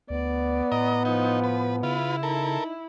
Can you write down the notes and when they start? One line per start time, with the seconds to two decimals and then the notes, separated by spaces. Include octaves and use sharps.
0.10 D2 B3 D5
0.72 A2 D#5 A#5
1.05 F3 D#4
1.44 B4
1.83 C#3 E4 F4 B4
2.23 D#4 A4 A#4